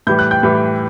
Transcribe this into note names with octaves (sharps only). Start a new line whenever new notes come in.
A2 E3 G3 G6
F#6
G5 G6
A2 E3 G3